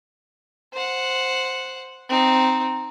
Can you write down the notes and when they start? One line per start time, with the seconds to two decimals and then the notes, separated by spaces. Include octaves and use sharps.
0.73 C5 F#5
2.09 C4 D#4